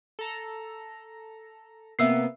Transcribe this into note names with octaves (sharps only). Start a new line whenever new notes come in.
A4 A#5
C3 A#3 B3 E5 E6 C7